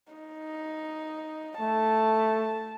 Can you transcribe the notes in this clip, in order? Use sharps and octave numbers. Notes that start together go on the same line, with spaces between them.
D#4
A3 A5